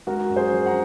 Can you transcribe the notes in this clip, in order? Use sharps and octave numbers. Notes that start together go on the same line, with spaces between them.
G#3 F#4 A#4
F#2
G#4 C5
F3
F#5 A#5